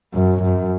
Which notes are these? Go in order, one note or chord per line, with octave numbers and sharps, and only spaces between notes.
F#2
F#2